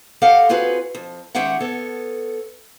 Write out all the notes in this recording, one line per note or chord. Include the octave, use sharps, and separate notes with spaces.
G4 A4 D#5 F5 F#5
C4 F4 F#4 G#4 B4
F2
D#3 G#3 C#4 G4 E5 F#5
B3 A4 C#5